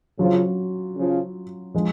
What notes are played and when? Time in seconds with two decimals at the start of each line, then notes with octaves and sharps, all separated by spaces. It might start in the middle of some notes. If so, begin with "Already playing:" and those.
0.19 C#3 F3 F#3 C#4 F4
0.96 C#3 F3
1.74 F3 G#3